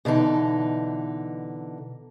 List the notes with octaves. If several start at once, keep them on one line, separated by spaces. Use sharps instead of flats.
B2 D3 E3 D#4